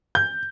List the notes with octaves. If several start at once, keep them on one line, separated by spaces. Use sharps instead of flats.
G6